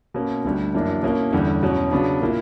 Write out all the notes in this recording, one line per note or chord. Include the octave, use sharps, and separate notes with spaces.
B2 A#3 C#4
D2 D3 G3
F#2 E3 A#3 D4
B2 A#3 C#4 E4
E2 D3 G3 C#4
E2 B2 F#3 C#4
C#3 F#3 B3 D4
A#2 A#3 E4